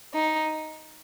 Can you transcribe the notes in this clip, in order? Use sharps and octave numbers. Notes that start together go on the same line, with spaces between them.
D#4